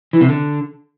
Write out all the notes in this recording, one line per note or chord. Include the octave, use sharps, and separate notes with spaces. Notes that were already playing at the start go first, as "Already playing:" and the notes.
E3
C3
D3